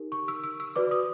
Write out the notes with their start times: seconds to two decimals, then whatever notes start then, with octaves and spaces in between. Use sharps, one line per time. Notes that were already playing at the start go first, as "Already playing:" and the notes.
Already playing: D#4 G4 A#4
0.12 C#6
0.28 E6
0.44 E6
0.60 E6
0.76 F#4 B4 D5 D6
0.91 D#6